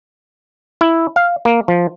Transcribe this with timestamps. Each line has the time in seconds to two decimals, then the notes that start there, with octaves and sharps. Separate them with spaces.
0.81 E4
1.16 F5
1.45 A#3
1.68 F3